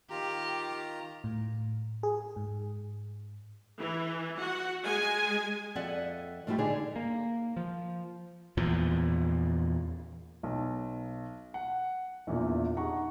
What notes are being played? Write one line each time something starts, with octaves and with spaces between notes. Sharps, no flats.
D#3 F4 G4 A#5
A2
G#4
G#2
E3
F#4 F#5
G#3 G#5
F2 A4 D5 E5 F#5
G#2 F3 A3 B3 E4 G4
D3 D#4 G#4 D5
A#3
F3
E2 A#2 F3
B1
F#5
A#1 E2 A#2 E3
D#4 G4 G#4 F#5 A#5 C#6